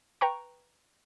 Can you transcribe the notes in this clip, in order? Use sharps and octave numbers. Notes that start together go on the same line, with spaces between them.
B4 G5 A#5 C#6